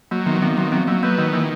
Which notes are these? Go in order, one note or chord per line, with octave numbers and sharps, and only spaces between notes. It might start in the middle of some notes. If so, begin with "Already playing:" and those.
F#3 A#3
D#3 B3
D#3 C4
F#3 B3
F#3 C4
F#3 A#3
A#3 B3
D#3 A#3
E3 A#3